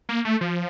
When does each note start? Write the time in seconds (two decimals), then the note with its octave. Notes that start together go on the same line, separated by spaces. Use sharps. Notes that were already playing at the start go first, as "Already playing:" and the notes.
0.09 A#3
0.25 A3
0.41 F3